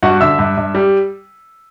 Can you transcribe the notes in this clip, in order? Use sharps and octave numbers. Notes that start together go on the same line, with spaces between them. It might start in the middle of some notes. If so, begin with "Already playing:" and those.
G2 F#4 F#5
D3 E5 E6
G2
G2
G3